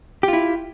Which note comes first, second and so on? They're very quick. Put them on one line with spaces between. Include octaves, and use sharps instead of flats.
G4 F4 E4